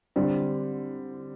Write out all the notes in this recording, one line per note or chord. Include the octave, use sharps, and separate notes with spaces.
D3 G3 C4